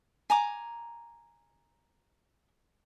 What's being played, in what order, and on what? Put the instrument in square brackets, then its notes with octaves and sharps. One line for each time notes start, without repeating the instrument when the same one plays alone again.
[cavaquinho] G#5 A#5 D6